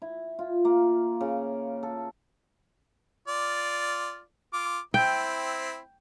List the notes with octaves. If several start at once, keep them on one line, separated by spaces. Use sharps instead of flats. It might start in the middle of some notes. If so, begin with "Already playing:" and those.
E4
F4
A#3
C#3
A4
F4 D5
F4 D6
C4 E4 G5